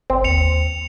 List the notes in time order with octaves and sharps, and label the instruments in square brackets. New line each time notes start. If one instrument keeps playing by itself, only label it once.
[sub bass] G1 [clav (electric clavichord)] C4
[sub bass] D#2 [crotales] C#7 F7